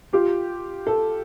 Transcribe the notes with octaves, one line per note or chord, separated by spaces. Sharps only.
F4 G4
A4